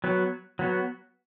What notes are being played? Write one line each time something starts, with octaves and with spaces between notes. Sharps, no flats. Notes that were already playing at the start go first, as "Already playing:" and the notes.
F#3 B3 F#4
F#3 B3 F#4